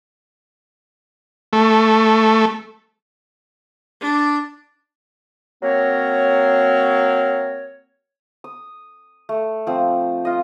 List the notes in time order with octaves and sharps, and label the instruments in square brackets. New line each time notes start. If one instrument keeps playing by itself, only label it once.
[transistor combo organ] A3
[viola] D4
[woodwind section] F#3 A#3 C4 A#4 C#5
[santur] D#6
A3
F3 C4
F4 D#5